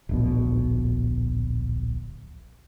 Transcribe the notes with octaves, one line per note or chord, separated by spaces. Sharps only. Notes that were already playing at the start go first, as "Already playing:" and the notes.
D1 A#1 B2